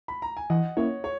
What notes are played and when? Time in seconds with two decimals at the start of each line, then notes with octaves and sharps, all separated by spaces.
0.08 B5
0.22 A#5
0.37 G#5
0.50 E3 D#5 F#5
0.77 A#3 C#4 E4 C#5
1.04 C#5